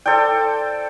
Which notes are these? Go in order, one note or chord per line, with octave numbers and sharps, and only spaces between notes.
A4 C5 D5 G5